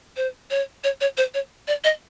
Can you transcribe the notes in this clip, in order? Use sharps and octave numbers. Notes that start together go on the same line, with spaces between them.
C5
C#5
C#5
C#5
C5
C#5
D5
D#5